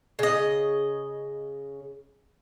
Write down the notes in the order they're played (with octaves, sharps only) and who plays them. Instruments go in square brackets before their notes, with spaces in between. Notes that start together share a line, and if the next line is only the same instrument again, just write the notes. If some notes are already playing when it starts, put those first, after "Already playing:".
[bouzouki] C#3 D#5